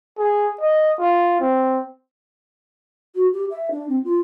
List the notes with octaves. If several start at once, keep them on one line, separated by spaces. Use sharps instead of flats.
G#4
D#5
F4
C4
F#4
G4
E5
D4
C4
F4